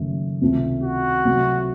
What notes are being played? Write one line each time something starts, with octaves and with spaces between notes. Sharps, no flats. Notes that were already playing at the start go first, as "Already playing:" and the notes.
Already playing: F#1 F#2 D#3 A3
C#2 C3 D#3 A3 C4
F#4
C3 F#3 A3